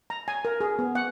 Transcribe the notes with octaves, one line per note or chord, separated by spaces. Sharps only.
A#5
G#5
A#4
G#4
B3
F#5